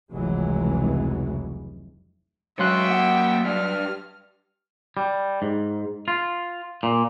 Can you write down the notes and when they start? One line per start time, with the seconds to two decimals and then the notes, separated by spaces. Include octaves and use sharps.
0.13 F1 C#2 E3 F#3 G#3
2.59 F#3 G#3 E5 F5 G5 C6 F#6
2.90 A#3 F#5
3.45 G2 G3 F6
4.97 G3
5.42 G#2
6.08 F4
6.83 A#2